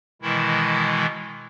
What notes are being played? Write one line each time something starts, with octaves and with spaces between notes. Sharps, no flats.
B2 D#3 E3 G#3 E4